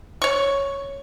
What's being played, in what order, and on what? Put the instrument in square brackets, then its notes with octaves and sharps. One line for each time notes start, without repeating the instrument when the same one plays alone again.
[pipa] C#5 C#6